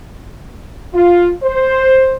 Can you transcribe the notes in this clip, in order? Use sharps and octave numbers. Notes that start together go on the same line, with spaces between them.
F4
C5